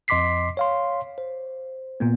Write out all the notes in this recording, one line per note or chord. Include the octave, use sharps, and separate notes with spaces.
F2 D#5 C6 D6 B6 C7
C#5 F5 C6
C5
A#2 A#3 B3